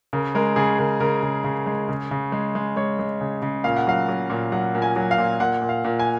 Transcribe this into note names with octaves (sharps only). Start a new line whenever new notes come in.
C#3 A#4
G#3 A#4
C#3 G#4
C#3 A#4
C#3 A#4
C#3
C#3
G#3
C#3
C#3
G#3
G#3
G#3 C#5
G#3
C#3
C#3
A#2 F5
F#5
F#3 F5
F#3
A#2
F#3 F#5
A#2
G#5
F#3
F5
A#2
A#2 F#5
A#2
F5
A#2
G#5